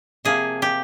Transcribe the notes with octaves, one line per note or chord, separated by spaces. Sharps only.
C3 F3 A#3 G#4
G4